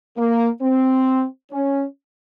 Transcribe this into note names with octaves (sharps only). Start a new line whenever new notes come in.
A#3
C4
C#4